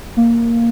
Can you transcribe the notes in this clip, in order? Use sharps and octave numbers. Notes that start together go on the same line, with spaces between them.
A#3